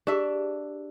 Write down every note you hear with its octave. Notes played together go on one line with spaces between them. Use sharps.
D4 G4 G#4 E5